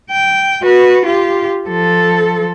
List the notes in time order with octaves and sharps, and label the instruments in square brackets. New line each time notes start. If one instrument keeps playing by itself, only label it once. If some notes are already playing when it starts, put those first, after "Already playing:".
[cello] G5
F#4 B4
F4 G4
F3 A4